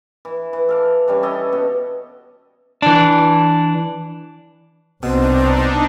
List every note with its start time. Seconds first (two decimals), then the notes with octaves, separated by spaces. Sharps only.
0.25 E3
0.53 E3
0.69 A4 F5 D6
1.08 E3 G3 C#4
1.23 C#4 G4 A4 D#5
1.53 B2
2.82 E3 D4
5.03 C2 B2 C4 D4 D#4